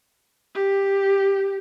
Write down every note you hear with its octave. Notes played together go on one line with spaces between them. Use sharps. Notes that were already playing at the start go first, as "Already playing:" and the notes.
G4